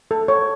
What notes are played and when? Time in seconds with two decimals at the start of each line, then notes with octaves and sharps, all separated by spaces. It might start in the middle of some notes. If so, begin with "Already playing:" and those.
0.11 A4
0.28 C#5